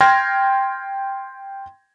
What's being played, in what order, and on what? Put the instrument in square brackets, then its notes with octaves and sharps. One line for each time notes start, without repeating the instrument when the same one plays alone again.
[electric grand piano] G5 C6 F6 G#6 A#6